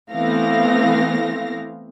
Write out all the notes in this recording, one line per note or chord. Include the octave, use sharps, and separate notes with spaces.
E3 A3 B3 C4 F5 A#6